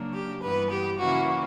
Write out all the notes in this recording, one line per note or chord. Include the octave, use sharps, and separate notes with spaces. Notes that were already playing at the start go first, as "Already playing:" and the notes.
Already playing: C#3 F#3 A#3 D4
G4
G2 E3 B3 B4
G4
C#3 E3 A#3 C#4 E4 F#4